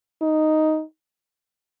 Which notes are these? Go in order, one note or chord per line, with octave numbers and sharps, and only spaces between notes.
D#4